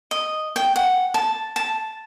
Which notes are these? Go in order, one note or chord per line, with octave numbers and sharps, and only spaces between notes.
D#5
G5
F#5
A5
A5